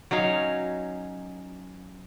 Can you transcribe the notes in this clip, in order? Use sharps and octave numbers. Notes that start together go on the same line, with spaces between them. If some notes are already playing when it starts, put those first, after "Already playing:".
F#3 C#4 D#4 F5